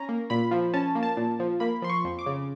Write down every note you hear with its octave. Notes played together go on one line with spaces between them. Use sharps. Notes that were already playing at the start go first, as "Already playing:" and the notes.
Already playing: C#4 A#5
A#3
A#2 B5
F3
C#4 A5
A#3
A5
A#2
F3
A#3 B5
F3 C6
C#6
F2
D6
C#3